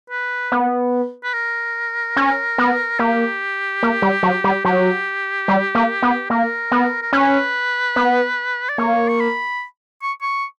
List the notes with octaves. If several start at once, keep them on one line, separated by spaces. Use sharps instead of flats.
B4
B3
B4
A#4
C#4
B3
A#3 G4
A#3
G3
F#3
G3
F#3 G4
G3
A#3
B3
A#3 A#4
B3
A#4
C#4 B4
B3
D5
A#3 C#5
C#6
B5
C#6
C#6